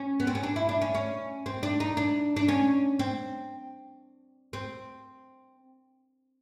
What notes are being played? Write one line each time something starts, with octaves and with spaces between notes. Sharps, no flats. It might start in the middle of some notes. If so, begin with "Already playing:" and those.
Already playing: C#4
B3
C4
C#4
D4
E4
D4
C#4
C#4
C4
D4
D#4
D4
D4
C#4
C4
C4